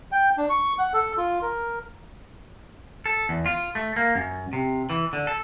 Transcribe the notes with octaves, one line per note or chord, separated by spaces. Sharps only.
G5
D4
C#6
F#5
A4
F4
A#4
A4
E2
F4
A3
A#3
F#2
C3
E3
D3
A4